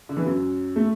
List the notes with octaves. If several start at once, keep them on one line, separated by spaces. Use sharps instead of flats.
D3
E3
F#2 F#3
A3